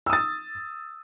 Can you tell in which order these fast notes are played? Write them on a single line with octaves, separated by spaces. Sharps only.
E6 D#6 A6